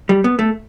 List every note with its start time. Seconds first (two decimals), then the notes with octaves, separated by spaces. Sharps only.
0.09 G3
0.24 B3
0.39 A3